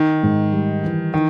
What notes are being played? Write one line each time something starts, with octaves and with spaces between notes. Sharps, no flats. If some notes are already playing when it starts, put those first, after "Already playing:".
Already playing: D#3
G#2
G3
E3
D#3